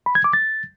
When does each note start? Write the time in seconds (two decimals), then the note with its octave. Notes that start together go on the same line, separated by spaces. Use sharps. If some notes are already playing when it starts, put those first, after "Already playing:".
0.06 B5
0.15 G#6
0.24 D6
0.33 A6